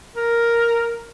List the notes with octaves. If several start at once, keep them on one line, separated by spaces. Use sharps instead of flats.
A#4